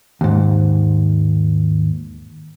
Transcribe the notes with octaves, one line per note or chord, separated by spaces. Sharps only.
D#2 G#2